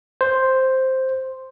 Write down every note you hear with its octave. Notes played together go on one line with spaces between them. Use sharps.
C5